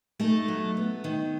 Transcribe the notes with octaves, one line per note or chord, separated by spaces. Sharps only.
A3 D#4 A4
F#3
B3
D#3